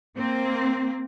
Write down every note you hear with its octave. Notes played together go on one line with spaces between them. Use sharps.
A#3 C4